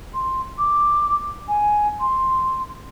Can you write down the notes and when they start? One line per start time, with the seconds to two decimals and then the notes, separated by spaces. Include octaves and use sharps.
0.14 C6
0.58 D6
1.48 G#5
2.00 C6